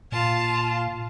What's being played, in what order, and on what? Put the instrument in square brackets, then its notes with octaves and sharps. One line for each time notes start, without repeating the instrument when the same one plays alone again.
[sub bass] A#2 [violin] F4 A5